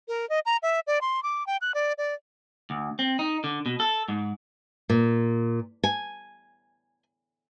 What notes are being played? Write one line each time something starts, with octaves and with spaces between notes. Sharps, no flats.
A#4
D#5
A#5
E5
D5
C6
D6
G5
F#6
D5
D5
D2
C4
D#4
D3
B2
A4
G#2
A#2
G#5